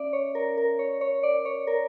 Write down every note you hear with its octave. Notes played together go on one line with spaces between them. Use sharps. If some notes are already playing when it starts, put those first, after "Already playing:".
Already playing: C#4 D5 E5
C#5
A#4
A#4
C#5
C#5
D5
C#5
A#4